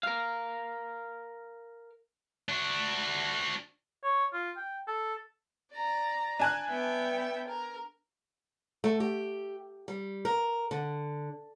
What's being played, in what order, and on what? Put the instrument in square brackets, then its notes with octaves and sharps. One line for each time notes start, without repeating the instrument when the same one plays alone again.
[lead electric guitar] A#4 F5
[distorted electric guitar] D4 F#4
[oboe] C#5
F4
G5
A4
[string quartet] D5 A#5
[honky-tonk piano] D4 G#5 F#6
[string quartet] B3 E5 G5
A#4
[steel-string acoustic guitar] A3
G4
G3
A#4
D3